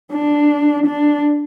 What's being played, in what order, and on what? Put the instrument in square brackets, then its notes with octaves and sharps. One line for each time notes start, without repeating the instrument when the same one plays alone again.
[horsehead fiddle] D4
D4